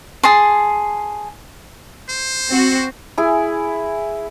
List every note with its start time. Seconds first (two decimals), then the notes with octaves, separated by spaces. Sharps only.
0.23 G#4 A5 C6
2.09 C5
2.49 C4 F#4
3.18 E4 G#4 G#5